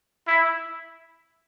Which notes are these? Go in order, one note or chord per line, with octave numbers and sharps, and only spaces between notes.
E4